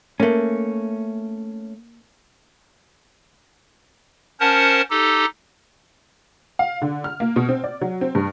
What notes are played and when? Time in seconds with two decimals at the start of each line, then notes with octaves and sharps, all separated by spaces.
0.20 A3 A#3 C#4
4.40 C#4 A#4 C5 F#5 A5
4.90 D#4 G4 A4
6.59 F5
6.82 D3
7.04 F6
7.20 A#3
7.36 B2
7.49 C4
7.64 D5
7.81 F#3
8.01 C4
8.15 G2